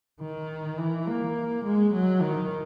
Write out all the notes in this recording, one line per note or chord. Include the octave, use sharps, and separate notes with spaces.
D#3
E3
A#3
G#3
F#3
D#3